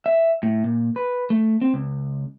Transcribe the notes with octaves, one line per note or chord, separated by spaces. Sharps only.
E5
A2
A#2
B4
A3
C4
C#2